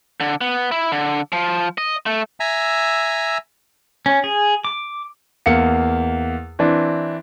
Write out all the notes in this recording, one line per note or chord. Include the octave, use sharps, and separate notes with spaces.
D3
B3
E4
D3
F3
D#5
A3
E5 G#5 A#5 E6
C#4
G#4
D6
E2 A#3 F5 C#7
E3 C4 D4